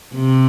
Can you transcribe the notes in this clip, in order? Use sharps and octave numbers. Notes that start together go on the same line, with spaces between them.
C3